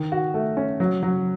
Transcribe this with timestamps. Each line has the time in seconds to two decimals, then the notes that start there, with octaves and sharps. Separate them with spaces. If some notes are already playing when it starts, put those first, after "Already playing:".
Already playing: D#3
0.12 F#4
0.34 A3
0.57 C#4
0.80 F#3
1.03 F#3